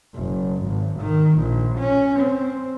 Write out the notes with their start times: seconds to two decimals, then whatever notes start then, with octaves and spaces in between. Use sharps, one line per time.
0.15 F#1
0.64 G#1
1.00 D#3
1.39 A#1
1.79 C#4
2.20 C4